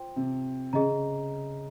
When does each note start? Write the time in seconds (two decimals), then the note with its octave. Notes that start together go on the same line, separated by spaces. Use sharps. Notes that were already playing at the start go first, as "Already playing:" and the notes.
Already playing: F4 C5 G5 C6
0.16 C3
0.73 C#3 G#4 D#5 A#5